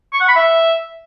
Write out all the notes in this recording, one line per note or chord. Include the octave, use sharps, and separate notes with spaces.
C#6
F#5
B5
E5